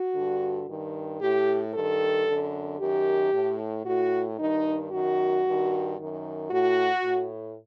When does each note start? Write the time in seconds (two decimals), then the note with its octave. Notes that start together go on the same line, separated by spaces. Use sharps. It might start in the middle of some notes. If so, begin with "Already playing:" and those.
Already playing: F#4
0.15 G2 D3
0.68 G2 D#3
1.22 A2 G4
1.74 G2 D#3 A4
2.28 F#2 D3
2.80 F#2 D#3 G4
3.34 A2
3.86 A2 F#4
4.39 G2 D#3 D#4
4.92 F#2 D#3 F#4
5.46 G2 D#3
5.98 F#2 D#3
6.51 A2 F#4
7.04 A2